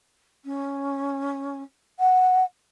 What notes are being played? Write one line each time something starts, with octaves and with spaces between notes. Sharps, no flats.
C#4
F#5